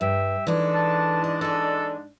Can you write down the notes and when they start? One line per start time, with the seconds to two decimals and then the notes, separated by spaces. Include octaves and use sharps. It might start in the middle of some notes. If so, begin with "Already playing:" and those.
0.01 G2 G4 E5
0.47 G#2 E3 D4 A4
0.75 A5
1.24 D5 D#5
1.41 A4 D#5 G#5